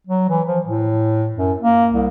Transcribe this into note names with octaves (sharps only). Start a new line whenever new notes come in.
F#3
E3
F3
A2
F#2
A#3
C2